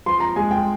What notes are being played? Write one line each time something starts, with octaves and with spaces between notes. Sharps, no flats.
F3 C6
A#5
G#3 G#5
G5